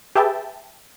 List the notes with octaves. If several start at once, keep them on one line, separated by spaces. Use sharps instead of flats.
G4 G#4 B4 E5 G5 A5